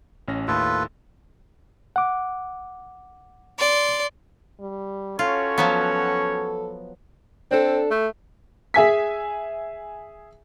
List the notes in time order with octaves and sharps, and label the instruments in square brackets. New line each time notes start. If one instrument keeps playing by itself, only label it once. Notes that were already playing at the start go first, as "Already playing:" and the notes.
[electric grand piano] A1 C#4 A#6
[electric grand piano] D#2 A2 [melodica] F4 A4 B4
[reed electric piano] F#5 D6
[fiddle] D5 C6
[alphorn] G3
[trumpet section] C#4 F#4 C#5 [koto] F4 [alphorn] A4
[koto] F3 F#3 B3
[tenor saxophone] C4 [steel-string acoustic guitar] D4 A4
[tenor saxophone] A3
[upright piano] G#4 E5 G#5 B6